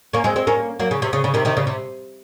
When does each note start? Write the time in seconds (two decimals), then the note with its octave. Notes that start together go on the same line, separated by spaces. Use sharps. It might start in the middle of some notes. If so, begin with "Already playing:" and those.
0.13 A#3 C#4
0.24 G#3 C4
0.36 G#3 C4
0.47 A#3 C#4
0.79 F#3 A#3
0.91 C#3
1.02 C3
1.13 C#3
1.24 C#3
1.34 C3 D#3
1.45 C3 D#3
1.57 C#3
1.67 C3